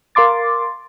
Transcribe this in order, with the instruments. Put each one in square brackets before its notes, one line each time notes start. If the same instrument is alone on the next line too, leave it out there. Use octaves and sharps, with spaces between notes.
[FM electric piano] A#4 F5 C6 D6 A6